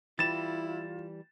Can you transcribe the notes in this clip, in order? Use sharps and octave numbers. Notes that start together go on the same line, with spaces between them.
E3 G3 E4 F4 A6 E7